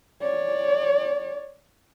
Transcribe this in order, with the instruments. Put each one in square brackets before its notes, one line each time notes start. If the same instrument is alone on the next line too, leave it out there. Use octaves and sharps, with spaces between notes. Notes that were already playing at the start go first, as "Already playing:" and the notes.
[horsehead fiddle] C#5 D5